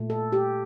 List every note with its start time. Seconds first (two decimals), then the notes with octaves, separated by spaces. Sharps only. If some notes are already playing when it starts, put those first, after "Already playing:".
Already playing: A#2 A3
0.10 A4
0.32 G4